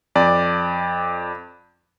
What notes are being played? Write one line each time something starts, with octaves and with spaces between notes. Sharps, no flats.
F2 D5